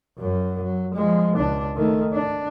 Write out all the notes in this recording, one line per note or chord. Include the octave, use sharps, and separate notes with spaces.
F#2 F#3
F#3
F3 G#3
C#2 D4
D#3 A3
D4